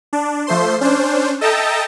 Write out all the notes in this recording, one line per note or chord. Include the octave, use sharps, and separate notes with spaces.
D4
F3 A3 C5 C6
C#4 D4 C5
A4 D#5 E5 G5 A5 A#5